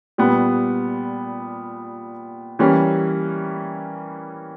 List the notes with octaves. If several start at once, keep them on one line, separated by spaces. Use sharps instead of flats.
A#2 G3 B3
E3 G3 A#3 C#4